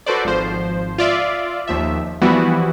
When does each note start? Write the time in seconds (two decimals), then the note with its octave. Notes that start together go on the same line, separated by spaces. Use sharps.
0.06 F#4 A4 B4 C5 D5
0.24 G#1 F3 C5
0.98 F4 D5 E5
1.68 D#2 F3 E5
2.22 E3 F3 G3 B3 E4 F#4